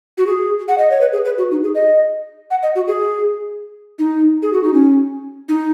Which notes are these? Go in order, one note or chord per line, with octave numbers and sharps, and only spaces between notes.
F#4
G#4
F#5
D#5
C#5
B4
G#4
B4
F#4
D#4
G#4
D#5
F#5
D#5
F#4
G#4
D#4
G#4
F#4
D#4
C#4
D#4